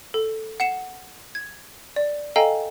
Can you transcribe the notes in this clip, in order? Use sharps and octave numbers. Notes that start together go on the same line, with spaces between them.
A4
F#5 C7 C#7 E7
G#6
D5
A4 D#5 F5 G5 G#5 A#5